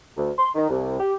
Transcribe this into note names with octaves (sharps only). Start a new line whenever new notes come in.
D2
C6
D#3
C2
G4